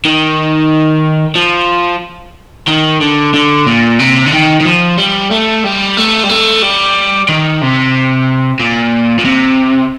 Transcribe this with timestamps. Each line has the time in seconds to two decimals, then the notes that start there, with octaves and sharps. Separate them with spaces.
0.05 D#3
1.36 F3
2.68 D#3
3.01 D3
3.34 D3
3.67 A#2
4.00 C3
4.27 D3
4.32 D#3
4.60 D#3
4.65 F3
4.98 G3
5.31 A3
5.64 G3
5.97 A3
6.24 G3
6.29 A3
6.62 G3
7.29 D#3
7.62 C3
8.60 A#2
9.19 A#2
9.25 C3